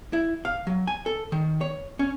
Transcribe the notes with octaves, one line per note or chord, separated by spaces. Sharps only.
E4
F5
F#3
G#5
A4
D#3
C#5
C#4